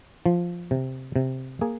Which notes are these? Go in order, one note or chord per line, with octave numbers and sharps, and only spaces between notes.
F3
C3
C3
A#3 G#4